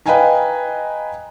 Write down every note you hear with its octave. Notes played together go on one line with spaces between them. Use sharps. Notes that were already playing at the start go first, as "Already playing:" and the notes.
B4 D#5 F5 G5 G#5 A#5